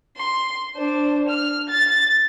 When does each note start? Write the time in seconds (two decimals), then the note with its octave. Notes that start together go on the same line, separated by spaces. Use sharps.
0.17 C6
0.76 D4 C5
1.28 F6
1.69 A6